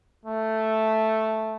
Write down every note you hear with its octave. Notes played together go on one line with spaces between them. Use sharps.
A3